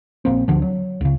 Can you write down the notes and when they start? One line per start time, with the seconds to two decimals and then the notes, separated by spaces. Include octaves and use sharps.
0.25 A#1 G#2 A#3 C4
0.48 D2 D3 F3
0.62 F#3
1.01 C#2 C#3